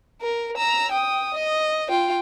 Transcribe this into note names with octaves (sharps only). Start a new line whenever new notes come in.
A#4
A#5 E6
G5 D#6
D#5
F4 G5